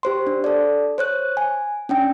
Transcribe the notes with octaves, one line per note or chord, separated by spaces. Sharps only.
G4 C5 C6
D4
A4 D5
C5 C#5 F#6
G#5
C#4 D4 G5